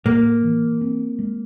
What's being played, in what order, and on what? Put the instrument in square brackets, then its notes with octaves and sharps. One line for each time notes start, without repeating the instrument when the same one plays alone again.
[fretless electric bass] A2 [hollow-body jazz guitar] A#3
[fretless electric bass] E3
C4
G#3